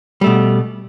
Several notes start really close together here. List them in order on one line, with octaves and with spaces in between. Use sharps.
G3 A3 B2